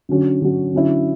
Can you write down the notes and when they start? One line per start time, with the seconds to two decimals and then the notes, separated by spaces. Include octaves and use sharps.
0.09 D3 F#3 C#4 F#4
0.41 D3 F#3 C#4 F#4
0.73 D3 F#3 C#4 E4